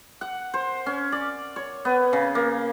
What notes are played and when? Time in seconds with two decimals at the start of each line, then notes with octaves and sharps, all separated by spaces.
0.21 F#5
0.54 C5
0.86 C#4
1.12 D5
1.56 C#5
1.85 B3
2.13 C#3
2.35 A#3